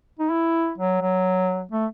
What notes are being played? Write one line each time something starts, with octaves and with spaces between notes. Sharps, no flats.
D#4
E4
F#3
F#3
A3